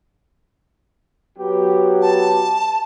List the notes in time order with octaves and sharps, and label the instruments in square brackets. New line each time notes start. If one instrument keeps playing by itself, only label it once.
[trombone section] F#3 B3 G4
[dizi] A5